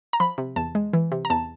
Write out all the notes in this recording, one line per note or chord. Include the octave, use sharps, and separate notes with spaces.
A#5
F3 B5
C3
E2 A5
G#3
E3
C3
A#5
E2 A5